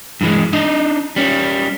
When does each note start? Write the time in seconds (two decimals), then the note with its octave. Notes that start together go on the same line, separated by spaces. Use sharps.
0.21 G2 E3 G#3
0.53 D4 D#4 D#5
1.16 G3 C#4